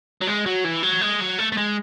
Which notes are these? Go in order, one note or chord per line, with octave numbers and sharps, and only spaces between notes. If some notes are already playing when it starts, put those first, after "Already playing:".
F#3
G#3
F#3
E3
F#3
G#3
F#3
A3
A3
G#3